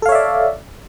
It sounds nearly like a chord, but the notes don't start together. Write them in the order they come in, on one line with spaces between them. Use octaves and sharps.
A4 F5 C#5 E5 D5